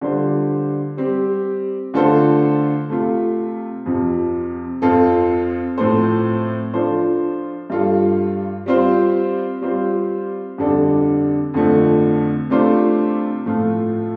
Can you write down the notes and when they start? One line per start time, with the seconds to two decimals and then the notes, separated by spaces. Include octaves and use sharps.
0.01 D3 G3 F4 C5
0.97 G3 C4 G4
1.94 D3 A3 F4 A4 C5
2.89 C3 A3 F4
3.86 F2 C3 F3
4.82 F2 F3 C4 F4 A4
5.78 A2 F3 C4 A4 C5
6.74 F3 D4 F4 A4 C5
7.70 G2 G3 F4 A4
8.66 G3 C4 F4 C5
9.61 G3 C4 F4 C5
10.58 F2 D3 G3 D4 A4
11.54 F2 D3 F3 A3
12.50 C3 A3 D4 F4 C5
13.46 A2 F3 A3 F4